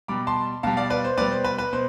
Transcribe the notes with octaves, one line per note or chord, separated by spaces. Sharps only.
B2 G3 B5 D6
A5 C6
B2 G3 F5 A5
D5 F5
B4 D5
C5
B2 G3 B4 D5
C5
B4
B4
B2 C5